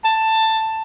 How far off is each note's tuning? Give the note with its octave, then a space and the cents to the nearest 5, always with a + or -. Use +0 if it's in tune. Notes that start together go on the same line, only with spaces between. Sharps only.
A5 +10